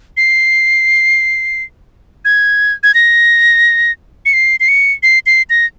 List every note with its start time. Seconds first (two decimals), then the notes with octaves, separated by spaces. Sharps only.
0.17 C7
2.25 G#6
2.83 G#6
2.94 A#6
4.26 C#7
4.33 C7
4.60 C7
4.68 C#7
5.03 C7
5.26 C7
5.50 A#6